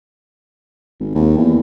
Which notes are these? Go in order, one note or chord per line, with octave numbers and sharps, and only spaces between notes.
G#1
D#2
E2